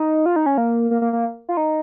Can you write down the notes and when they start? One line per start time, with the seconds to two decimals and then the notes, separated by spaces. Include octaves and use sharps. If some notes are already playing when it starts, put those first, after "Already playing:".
Already playing: D#4
0.26 F4
0.36 D#4
0.46 C#4
0.58 A#3
0.91 A#3
1.02 A#3
1.13 A#3
1.49 F4
1.57 D#4